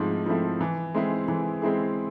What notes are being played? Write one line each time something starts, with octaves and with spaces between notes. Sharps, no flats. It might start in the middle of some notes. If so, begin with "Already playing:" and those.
Already playing: G#2 F3 A3 C4 E4
F3 A3 C4 E4
E3
G#3 C4 E4 G#4
E3
G#3 C4 E4 G#4